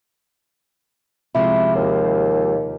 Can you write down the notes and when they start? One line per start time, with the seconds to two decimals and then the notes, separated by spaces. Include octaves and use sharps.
1.35 C3 F3 G#3 E4
1.75 D#2